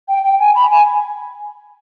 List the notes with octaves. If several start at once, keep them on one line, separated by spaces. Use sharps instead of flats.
G5
G5
G#5
B5
G#5